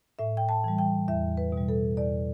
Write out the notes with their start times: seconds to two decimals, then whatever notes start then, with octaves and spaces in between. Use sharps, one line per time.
0.19 A2 E5
0.37 G5
0.49 A5
0.64 E3 G3
0.78 G5
1.08 E2 E5
1.37 B4
1.52 B2
1.57 G3
1.68 A4
1.97 E2 D5